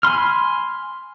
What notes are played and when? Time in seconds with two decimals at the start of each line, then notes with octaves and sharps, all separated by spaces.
0.03 G#5 B5 C6 F6